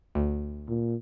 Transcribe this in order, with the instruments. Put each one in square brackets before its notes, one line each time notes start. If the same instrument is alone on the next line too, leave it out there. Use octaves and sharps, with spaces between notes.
[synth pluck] D2
[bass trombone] A#2